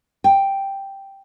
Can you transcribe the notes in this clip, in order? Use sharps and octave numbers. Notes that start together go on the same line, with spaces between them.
G5